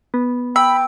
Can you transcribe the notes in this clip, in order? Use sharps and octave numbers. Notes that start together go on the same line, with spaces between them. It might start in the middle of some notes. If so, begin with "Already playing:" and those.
B3
G5 B5 E6